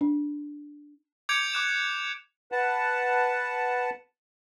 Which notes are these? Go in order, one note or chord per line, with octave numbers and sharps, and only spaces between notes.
D4
D6 G6 G#6 C#7 D7 F7
D6 F#6 E7
B4 F#5 A5